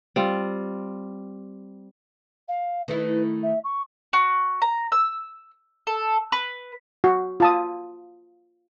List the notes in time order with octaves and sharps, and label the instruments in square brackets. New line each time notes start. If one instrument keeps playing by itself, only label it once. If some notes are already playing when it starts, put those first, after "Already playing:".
[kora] G3 C4 F4
[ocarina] F5
[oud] D#3 A3 E4 [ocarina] B4
[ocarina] E5
C#6
[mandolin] F#4
A#5
E6
A4
B4
[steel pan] F#4
F4 A5 D#6